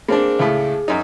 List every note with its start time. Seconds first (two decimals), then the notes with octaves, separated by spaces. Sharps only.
0.08 A#3 C4 D4 G#4
0.39 C#2 A2 A3
0.88 F#2 D#4